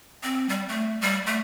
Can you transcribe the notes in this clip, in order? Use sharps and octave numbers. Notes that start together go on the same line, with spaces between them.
C4
G3
A3
G3
A3